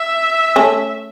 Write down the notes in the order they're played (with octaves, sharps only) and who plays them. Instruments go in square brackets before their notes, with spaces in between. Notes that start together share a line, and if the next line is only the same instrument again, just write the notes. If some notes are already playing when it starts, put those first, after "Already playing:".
Already playing: [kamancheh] E5
[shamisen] A3 C#4